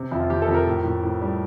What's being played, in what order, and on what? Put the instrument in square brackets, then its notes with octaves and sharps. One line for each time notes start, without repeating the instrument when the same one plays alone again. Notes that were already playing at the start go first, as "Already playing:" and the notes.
Already playing: [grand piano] C3
F2 E4
F4
F2 G4
A4
F2
A#4
A2
A2
A2
G3